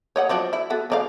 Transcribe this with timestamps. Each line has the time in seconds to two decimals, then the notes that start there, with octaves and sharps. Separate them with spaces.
0.16 C#5 D#5 F#5
0.29 F3 F#3 D4
0.53 E4
0.70 B3 F#4 A4
0.90 D3 D4 F5